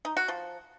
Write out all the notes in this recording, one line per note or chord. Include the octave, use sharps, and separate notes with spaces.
D#4
F#4
F3